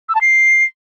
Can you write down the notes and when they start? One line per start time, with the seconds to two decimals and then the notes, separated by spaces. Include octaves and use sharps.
0.09 E6
0.15 A5
0.21 C7